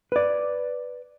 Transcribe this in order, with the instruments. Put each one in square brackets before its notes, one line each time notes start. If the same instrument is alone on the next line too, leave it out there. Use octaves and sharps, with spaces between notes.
[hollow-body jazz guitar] B4 D5